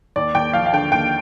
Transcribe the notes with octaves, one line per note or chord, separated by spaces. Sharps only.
D#2 D5
D#2 G5
F3 F5
F5
D3 G5
D#2 G5